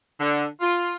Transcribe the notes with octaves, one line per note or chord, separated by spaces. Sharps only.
D3
F4